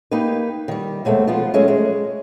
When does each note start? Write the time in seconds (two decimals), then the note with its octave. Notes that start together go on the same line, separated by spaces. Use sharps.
0.11 A#3 D#4 G4 B4
0.68 D#3 G3
1.05 D#2 B2 G#3 A3 C4
1.27 F3 G#3 B3 F4
1.54 F#3 G#3 A3 C#4
1.68 G#3